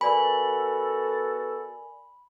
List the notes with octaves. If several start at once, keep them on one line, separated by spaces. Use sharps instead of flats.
B3 F#4 A4 A#4 D5 G#5 B5